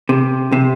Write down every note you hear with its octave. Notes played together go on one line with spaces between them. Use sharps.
C3
C3